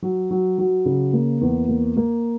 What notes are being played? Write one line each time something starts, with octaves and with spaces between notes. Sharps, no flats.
F#3
F#3
F#3
C#3
A#3
E2
A#3
A#3